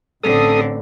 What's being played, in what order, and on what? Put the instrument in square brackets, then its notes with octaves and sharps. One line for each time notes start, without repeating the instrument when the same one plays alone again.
[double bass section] A1 [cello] D3 C4 [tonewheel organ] A4 D#6